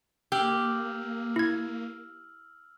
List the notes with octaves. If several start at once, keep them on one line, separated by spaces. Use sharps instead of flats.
A#3 G4 E6 F6 F#7
E4 G#6